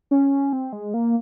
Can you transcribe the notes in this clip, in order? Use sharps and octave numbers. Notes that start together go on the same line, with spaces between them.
C#4
C4
G#3
A#3